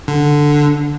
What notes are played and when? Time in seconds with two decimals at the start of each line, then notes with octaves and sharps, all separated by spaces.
0.08 D3